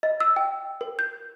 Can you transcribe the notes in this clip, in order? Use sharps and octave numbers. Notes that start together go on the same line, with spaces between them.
D#5
E6
G5
A#4
G6